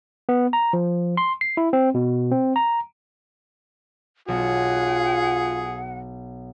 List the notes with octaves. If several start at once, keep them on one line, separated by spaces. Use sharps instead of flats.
B3
A#5
F3
C6
C7
E4
C4
B2
C4
A#5
B1 F4 G#4 F#5